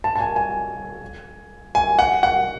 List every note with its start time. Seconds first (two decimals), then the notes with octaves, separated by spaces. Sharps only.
0.04 A5
0.16 A5
0.20 G#5
0.36 G#5
1.75 G#5
1.99 F#5
2.23 F#5